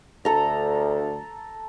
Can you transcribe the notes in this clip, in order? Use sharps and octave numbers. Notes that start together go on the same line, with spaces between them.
D2 A4 A#5